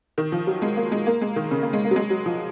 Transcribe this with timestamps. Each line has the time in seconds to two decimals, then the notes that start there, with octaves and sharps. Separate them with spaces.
0.18 D#3
0.32 F3
0.47 F#3
0.62 G#3
0.77 A#3
0.92 G#3
1.06 A#3
1.21 G#3
1.36 D#3
1.51 C#3
1.63 A#3
1.73 G#3
1.85 A#3
1.91 F#3
1.96 G#3
2.10 F#3
2.26 F3